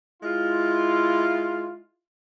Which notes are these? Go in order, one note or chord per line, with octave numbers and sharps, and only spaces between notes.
G#3 E4 F4